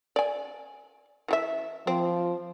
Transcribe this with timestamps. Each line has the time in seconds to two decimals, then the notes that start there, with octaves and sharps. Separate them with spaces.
0.16 D5 G#5
1.28 E3 G4 E5
1.87 F3 C4